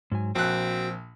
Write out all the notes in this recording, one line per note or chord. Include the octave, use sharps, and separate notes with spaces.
G#2 F#3 G#5
A#1 C4 F#4 F#6